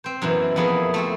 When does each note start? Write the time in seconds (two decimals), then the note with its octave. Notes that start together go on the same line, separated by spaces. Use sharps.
0.04 C4 C5
0.22 F#2 B2 E3
0.56 F2 A#3 B3 E4 G#4
0.94 A3 C4 A4